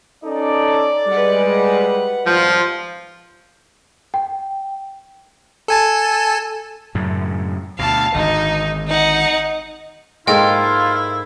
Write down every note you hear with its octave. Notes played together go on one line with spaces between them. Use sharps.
C#4 D#4 A4 D5
G3 G#3 B4 F#5
G#1 F3 G3 F4
G5
A4 G#5 A5
F#2 A2 C#3
D2 B2 F5 A5
G#1 D3 D#4
D#4 F#5
G#2 A#3 E4 F4 A4 D#5 G5